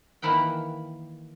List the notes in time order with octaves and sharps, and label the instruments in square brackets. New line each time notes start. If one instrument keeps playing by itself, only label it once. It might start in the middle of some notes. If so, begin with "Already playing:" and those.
[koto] D#3 E3 A#3 E4 F#5 G5